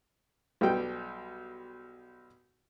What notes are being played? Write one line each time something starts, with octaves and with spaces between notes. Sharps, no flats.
B1 G3 G5